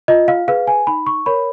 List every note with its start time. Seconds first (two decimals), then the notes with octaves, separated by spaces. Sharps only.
0.08 F4 D#5
0.28 F5
0.48 G#4 B4 F5
0.67 G#5
0.87 D#4 B5
1.06 C#6
1.26 A#4 C#5 B5